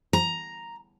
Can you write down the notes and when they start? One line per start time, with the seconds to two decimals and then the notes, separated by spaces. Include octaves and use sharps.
0.13 A#5